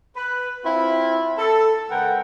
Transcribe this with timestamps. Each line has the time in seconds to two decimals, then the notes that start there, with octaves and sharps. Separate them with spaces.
0.16 B4
0.65 C4 E4 F4
1.38 A4
1.90 C#3 G#3 A#4 B4 F#5 G5